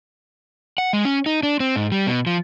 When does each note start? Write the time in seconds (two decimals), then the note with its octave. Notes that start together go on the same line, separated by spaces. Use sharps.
0.78 F#5
0.93 G#3
1.05 C#4
1.26 D#4
1.43 D4
1.60 C4
1.76 G#2
1.92 G3
2.07 B2
2.27 F3